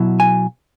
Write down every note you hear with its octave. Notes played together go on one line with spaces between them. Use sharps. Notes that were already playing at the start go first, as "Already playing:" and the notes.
Already playing: B2 F#3 E4
G#5